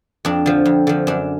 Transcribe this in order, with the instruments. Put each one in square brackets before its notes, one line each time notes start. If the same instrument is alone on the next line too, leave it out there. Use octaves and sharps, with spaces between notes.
[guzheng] F2 D4
D3 F3
F2
D3 F3
F#2 D4